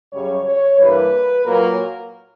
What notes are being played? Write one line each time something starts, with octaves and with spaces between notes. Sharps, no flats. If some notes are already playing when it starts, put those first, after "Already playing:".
F#2 C#3 G3 C#5
C#5
G2 E3 G3 A#3 B4
A#2 F#3 A#3 A#4